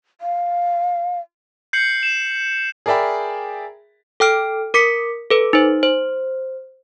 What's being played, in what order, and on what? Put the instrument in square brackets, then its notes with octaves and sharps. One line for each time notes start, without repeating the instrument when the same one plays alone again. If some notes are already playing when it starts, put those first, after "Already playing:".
[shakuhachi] F5
[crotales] G6 C7 C#7 F#7
E7
[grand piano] G#4 A#4 D5 E5 G5 B5
[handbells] A4 G5 F6 D7
A#4 D6 B6 C#7
A4 B4
D#4 C5
C5